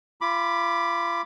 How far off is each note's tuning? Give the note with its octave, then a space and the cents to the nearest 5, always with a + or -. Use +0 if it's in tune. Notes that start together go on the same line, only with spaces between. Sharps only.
F4 -35 B5 +0 D6 +5